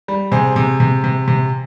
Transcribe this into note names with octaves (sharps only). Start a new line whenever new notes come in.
G3
C3 G#4 C5
C3
C3
C3
C3